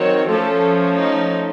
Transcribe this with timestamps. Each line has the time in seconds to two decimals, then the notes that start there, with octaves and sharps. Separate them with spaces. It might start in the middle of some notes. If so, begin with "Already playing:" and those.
Already playing: D#3 F#3 C4 C#5
0.28 F3 A3 C#4 A4
0.97 D#4